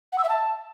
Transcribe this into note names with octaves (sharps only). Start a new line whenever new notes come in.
F#5
E6
E5
A5